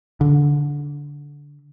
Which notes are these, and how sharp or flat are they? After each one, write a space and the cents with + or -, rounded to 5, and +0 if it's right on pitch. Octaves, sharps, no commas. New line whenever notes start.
D3 -15